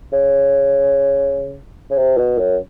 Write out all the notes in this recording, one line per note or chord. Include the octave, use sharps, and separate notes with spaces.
C#3
C#3
C3
B2
F#2